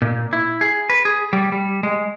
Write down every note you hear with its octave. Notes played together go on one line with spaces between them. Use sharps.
A#2
E4
G#4
B4
G#4
G3
G3
G#3